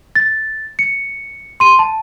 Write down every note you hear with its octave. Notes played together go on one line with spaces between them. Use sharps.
A6
C#7
C6 D#7
A5